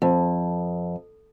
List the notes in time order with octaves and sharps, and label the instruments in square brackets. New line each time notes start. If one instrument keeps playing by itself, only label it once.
[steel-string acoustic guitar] F2